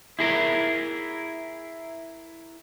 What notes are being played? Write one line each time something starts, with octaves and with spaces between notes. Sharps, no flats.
E4 G#4 A#4